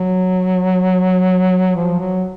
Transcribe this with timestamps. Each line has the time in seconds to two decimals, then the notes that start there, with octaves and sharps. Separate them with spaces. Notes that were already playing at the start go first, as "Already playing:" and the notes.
Already playing: F#3
1.76 F3
1.99 F#3